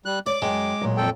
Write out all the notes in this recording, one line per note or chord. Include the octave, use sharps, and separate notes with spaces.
G3 F#6
C#5 D5 D6
F#2 G#3 G5 A5
A#2 F#3 D#5
F2 A4 G5